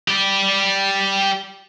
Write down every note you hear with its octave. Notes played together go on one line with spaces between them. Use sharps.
G4 D5